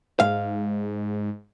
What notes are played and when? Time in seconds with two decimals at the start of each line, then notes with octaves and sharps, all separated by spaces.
0.20 G#2 F5